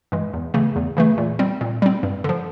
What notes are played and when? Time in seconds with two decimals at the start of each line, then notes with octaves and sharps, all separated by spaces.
0.12 G2 E3 G#3
0.33 E2
0.54 C#3 E3 A3
0.76 E2
0.97 C#3 E3 A3
1.18 A#2
1.39 G3 C4
1.61 A#2
1.82 G3 C4
2.03 G2
2.24 D3 F3